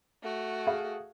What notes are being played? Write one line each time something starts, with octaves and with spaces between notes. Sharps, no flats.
A3 F#4
G#4 F5